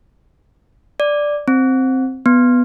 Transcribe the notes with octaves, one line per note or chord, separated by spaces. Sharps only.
D5
C4
B3